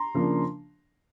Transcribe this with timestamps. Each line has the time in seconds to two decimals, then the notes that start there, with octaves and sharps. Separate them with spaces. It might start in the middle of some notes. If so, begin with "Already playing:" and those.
Already playing: A#5 C6
0.14 C#3 F3 A#3 D4